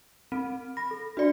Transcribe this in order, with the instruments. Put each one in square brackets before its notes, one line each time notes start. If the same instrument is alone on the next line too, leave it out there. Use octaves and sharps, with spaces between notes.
[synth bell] C4
[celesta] B5 [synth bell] A#6
[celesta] A4
[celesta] D4 [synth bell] F#4 D5